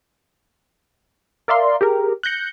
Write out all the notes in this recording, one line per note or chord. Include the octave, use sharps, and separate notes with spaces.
A#4 D5 E5 F5 C6
G4 G#4 A#4
F#6 G6 A#6 C#7